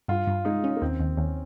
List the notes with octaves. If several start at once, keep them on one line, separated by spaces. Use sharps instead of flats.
G2 F4
G2
G#3 D#4
C#4
A#3
D#2 C4
D#2
D#2 C#4